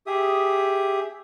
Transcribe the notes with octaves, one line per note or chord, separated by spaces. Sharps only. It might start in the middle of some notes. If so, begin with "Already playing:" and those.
G4 G#4 E5 D#6